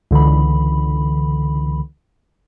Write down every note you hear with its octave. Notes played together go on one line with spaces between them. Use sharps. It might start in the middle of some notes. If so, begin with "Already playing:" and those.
C#2 D3 E3 B5